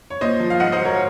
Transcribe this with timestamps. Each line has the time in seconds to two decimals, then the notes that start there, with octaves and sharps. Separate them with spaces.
0.10 C#5
0.21 A#2 C5 D#5
0.40 F3
0.50 F5
0.60 G#2 D#5 F#5
0.72 C5 D#5
0.79 F#3
0.85 A#4 C#5